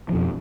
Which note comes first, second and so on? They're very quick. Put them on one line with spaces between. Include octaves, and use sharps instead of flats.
F3 B2 F2